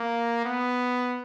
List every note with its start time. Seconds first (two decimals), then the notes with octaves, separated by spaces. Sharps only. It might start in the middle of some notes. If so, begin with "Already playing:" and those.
Already playing: A#3
0.45 B3